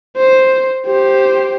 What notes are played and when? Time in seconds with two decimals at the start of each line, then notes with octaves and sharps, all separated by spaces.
0.17 C5
0.87 G4 C5